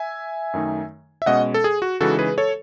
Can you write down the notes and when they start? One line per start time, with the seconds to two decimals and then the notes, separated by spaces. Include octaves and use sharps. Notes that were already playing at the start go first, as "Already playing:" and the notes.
Already playing: E5 G#5
0.53 F#2 D#3 A3 D#4
1.22 E5
1.26 B2 G#3 C#4 D#5 F#5
1.54 A4
1.64 G#4
1.82 F#4
2.00 C#3 E3 G#3 D#4 F#4 A4
2.19 G#4 B4
2.38 A4 C#5